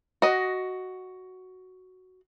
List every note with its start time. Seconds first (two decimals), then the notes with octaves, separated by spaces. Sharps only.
0.22 F#4 D#5